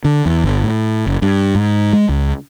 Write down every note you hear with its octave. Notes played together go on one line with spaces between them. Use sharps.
D3
E2
G1
A2
F#1
G2
G#2
G#3
C#2